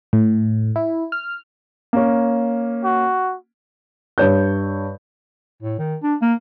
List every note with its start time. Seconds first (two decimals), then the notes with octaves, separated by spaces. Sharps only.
0.13 A2
0.76 E4
1.12 F6
1.93 A#3 C#4
2.84 F#4
4.18 G2 C#5 G6
5.62 A2
5.79 D#3
6.03 D4
6.21 A#3